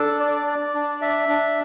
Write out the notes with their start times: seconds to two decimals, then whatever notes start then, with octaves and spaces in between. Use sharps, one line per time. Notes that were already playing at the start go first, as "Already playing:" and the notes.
Already playing: D4 A4
0.20 D5
0.47 D5
0.74 D4
1.02 E5
1.29 D4